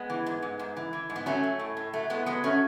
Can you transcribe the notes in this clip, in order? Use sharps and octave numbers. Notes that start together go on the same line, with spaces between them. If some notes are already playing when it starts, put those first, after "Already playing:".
Already playing: G#3 B3
E3
G#2
G#2
G#2
E3
E3
G#2
B3
F#3 A3 C#4
F#3
A2
A2
F#3 A3
A2 G#3 B3
F#3 G#3 B3
F#3 A3 C#4